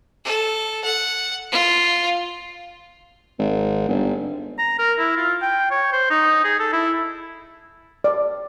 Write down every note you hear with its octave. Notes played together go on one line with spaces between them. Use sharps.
A4
F#5
F4
G#1
G1
A#5
A#4
E4
F4
G5
C#5
C5
D#4
G#4
A4
E4
D5